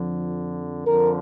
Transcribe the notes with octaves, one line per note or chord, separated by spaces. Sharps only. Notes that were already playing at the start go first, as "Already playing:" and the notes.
Already playing: F2 D3 F3
F2 D3 F3 A#4